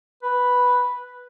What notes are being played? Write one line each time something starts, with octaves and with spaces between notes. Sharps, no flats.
B4